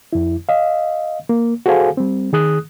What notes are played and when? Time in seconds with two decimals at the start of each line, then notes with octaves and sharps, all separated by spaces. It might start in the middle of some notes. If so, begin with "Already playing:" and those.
0.13 F2 E4
0.49 D#5 F5
1.29 A#3
1.66 F#4 G#4 A4 C5 F5 G#5
1.97 G3 C4
2.33 D#3 G#4 D#6 F#6